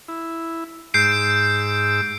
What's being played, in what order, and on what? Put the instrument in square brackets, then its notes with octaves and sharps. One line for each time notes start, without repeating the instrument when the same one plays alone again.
[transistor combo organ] E4
[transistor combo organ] G#2 E6 [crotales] G6 C7 D7